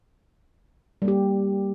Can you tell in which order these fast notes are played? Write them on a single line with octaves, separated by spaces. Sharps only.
G3 A#3 G4